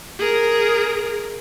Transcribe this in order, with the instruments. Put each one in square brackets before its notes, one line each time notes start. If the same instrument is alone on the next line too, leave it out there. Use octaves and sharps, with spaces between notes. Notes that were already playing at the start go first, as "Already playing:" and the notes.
[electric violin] G#4 A#4